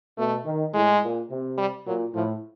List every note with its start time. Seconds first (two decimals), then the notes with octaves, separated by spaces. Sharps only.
0.18 B2 A3
0.46 D#3
0.74 A2 G#3
1.02 A#2
1.30 C3
1.58 G3
1.87 A#2 F#3
2.14 A2 F3